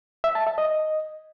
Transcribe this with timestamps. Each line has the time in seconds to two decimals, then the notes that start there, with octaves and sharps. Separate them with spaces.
0.24 E5
0.35 A5
0.47 E5
0.58 D#5